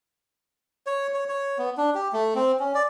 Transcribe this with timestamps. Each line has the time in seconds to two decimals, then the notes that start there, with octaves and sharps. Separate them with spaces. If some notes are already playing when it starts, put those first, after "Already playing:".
0.87 C#5
1.14 C#5
1.29 C#5
1.58 B3
1.77 D4
1.95 G4
2.13 A3
2.35 C4
2.60 C#4
2.75 D5